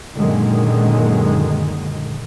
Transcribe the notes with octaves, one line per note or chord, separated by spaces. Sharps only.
F#2 A#2 D3 D#3 G#3